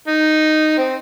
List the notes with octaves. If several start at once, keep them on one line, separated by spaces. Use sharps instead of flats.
D#4
C4